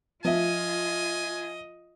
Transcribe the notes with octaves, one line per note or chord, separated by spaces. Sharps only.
F3 F4 D#5 E5 G#5